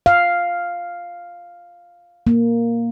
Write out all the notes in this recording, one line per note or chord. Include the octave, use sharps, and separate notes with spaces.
F5
A#3